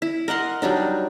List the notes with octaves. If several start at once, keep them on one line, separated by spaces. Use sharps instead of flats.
E4
A#4 D#5 F#5 C6
F#3 G3 D4 D#4